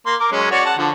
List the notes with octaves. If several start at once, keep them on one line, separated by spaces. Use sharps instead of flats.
A#3 C6
A#4 D6
F#3 G#3 C#4
F#4 C#5 D5
F#5 A5
D3 F3